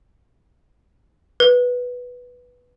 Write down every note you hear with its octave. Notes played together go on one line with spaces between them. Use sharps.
B4